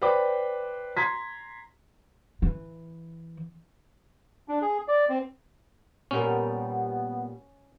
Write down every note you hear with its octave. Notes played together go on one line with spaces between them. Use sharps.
B4 C5 D5 G5 B5 D6
A#5 C6 G#6 B6
E3
D4
G#4
D5
C4
A#2 G3 B3 C#4 A#4